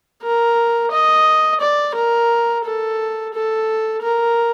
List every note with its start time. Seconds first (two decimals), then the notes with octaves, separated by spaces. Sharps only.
0.23 A#4
0.91 D#5
1.60 D5
1.95 A#4
2.65 A4
3.34 A4
4.02 A#4